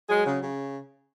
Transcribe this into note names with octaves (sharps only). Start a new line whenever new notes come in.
F#3 G#3 G#4
C#3
C#3